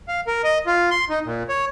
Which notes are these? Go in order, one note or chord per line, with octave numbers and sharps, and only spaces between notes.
F5
A#4
D#5
F4
C6
D#4
A#2
C#5